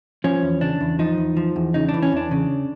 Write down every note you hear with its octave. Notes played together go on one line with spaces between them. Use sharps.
F3 C#4
E2
C#3 D4
E2
F3 D#4
E2
F3
E2
C#3 D#4
D4
E3
C#4
E2 D4
C#3